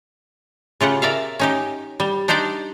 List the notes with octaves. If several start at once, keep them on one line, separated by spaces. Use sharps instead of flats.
C#3 F4 G4 F#5
A#4 D5 E5 F5
C#4 D#4 G4
G3
D4 D#4 G4 C5 D5